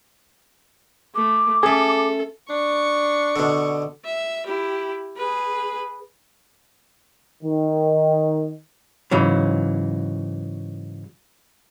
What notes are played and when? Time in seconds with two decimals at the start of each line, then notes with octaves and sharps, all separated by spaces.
1.15 A3 D6
1.63 A3 C#4 G#4 A4
2.50 D4 C#6
3.36 B2 D3
4.05 E5
4.46 E4 G4
5.17 G#4 B4
7.43 D#3
9.11 G#2 C#3 E3 F#3